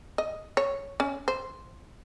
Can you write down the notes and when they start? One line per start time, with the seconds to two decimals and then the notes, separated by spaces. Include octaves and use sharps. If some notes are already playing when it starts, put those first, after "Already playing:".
0.18 D#5
0.57 C#5
1.00 C#4
1.28 C5